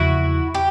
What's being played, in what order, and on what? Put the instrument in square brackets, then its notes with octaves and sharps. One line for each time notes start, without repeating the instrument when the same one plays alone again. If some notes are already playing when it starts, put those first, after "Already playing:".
Already playing: [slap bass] E2 C#3 F3 A#3 [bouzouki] E4 F#4
[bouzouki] G4